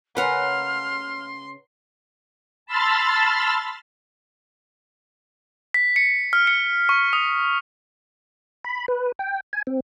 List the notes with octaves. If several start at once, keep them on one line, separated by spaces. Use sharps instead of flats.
C#3 C#4 A#4 B4 F#5 A#5 C6 F6
A5 B5 C6 E6 F6 A6
B6
C#7
F6
C#7
C#6
D#6
B5
B4
G5
G#5
C4